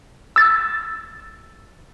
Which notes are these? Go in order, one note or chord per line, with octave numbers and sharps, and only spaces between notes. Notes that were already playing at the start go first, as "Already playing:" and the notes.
E6 A6